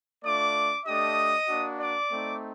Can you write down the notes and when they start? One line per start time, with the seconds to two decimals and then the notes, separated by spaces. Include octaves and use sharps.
0.24 A3 D4 F4 D5 D6
0.85 A3 D4 G4 D#5 D#6
1.48 A#3 D4 F#4
1.79 D5 D6
2.10 A3 C4 D#4